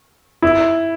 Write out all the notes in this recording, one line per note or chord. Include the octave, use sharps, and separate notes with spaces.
E4